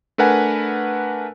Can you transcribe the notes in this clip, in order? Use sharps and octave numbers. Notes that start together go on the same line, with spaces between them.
A3 D4 A#4 B4 F#5 G#5